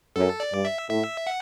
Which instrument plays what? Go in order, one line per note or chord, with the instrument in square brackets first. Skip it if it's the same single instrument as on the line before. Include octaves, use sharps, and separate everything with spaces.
[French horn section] F#2 [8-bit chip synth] A4
[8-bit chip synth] D5
[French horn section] G2
[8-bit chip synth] E5
[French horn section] A2 [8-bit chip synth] E5
[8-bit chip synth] F#5